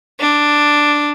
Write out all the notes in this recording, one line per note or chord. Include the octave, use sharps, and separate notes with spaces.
D4